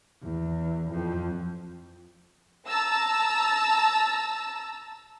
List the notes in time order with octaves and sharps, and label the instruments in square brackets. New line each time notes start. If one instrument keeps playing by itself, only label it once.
[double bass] E2
F2
[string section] A5 A#5 E6